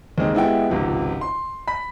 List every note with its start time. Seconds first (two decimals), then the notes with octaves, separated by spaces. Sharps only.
0.18 D#2 G#3 C4 D#4
0.35 G#3 B3 E4 G4 F#5 G5
0.69 G#1 C#2 C3 F3
1.21 C6
1.67 B5 B6